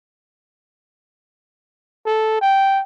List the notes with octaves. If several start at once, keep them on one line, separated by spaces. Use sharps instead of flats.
A4
G5